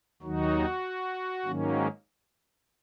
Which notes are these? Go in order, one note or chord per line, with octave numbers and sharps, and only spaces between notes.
D#2 D#3 F#3 D#4 F#4
G#2 D#3 F#3 A#3 C#4